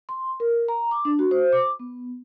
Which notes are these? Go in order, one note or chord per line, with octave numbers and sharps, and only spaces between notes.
C6
A#4
A#5
D6
D4
F#4
C5
D6
B3